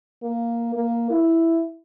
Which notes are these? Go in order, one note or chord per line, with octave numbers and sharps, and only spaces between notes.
A#3
A#3
E4